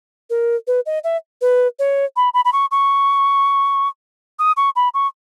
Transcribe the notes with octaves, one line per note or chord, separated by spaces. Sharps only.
A#4
B4
D#5
E5
B4
C#5
B5
B5
B5
C#6
C#6
D#6
C#6
B5
C#6